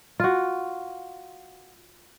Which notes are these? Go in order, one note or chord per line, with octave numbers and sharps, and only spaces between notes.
F4 F#4